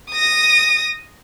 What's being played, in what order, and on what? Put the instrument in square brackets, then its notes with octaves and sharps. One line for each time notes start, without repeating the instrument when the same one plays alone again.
[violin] D#6 A#6